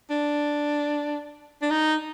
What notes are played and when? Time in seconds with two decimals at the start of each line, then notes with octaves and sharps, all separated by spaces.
0.10 D4
1.62 D4
1.71 D#4